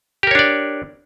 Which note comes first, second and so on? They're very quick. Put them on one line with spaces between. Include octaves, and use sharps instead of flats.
G4 A#4 C#5 D4 D5